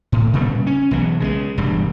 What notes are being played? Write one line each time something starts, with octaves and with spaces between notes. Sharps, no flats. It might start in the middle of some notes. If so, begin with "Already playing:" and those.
A2
A#2 C#3 G3 B3
C#4
B1 E3 B3
C#3 G3 G#3
E1 G2 G3